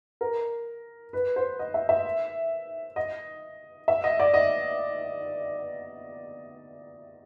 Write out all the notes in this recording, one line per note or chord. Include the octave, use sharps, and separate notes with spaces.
A#4
B4
C5
D#5
E5
E5
D#5
E5
D#5
D5
D#5